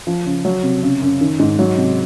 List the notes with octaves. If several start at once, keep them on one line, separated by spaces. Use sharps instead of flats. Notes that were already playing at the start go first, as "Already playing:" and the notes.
F3
C#3
F#3
C3
C#3
F#2
D#3
G#2
F#3
C3